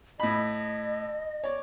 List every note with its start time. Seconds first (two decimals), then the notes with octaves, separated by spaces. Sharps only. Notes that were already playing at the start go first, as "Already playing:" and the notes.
0.20 A2 D#5 B5
1.44 C#5 D5